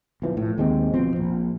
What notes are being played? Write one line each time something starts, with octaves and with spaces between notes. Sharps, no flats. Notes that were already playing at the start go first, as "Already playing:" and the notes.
B1 E3 F3
A2
D#2 G#3 C4
E2 B2 F3 C4
A#1